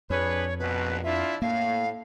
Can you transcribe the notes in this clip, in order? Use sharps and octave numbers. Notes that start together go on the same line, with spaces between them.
F2 D4 G#4 B4 C#5
A#1 B2 B4
D4 E4 F4 E5
A2 A#3 F5